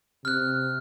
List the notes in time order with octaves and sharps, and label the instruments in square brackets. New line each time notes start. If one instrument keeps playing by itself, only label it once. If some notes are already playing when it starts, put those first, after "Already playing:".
[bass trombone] C3 [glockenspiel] F6 F#6